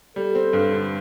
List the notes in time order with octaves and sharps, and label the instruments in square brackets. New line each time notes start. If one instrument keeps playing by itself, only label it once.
[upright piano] G3 [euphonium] A4
[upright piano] C4
G2
D3